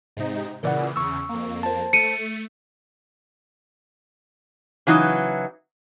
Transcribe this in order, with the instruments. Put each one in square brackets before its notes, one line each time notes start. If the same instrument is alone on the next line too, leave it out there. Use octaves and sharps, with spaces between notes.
[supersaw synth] G#2 C3 D#4
[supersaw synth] A#2 C#3 E3 [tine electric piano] A#4 D5 F#5
[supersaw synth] E2 C#3 [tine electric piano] C#6 E6
[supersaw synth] F2 A#3
[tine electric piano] C5 A5
[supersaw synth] A3 [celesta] C#7 D#7
[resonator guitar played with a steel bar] C#3 E3 F#3 D#4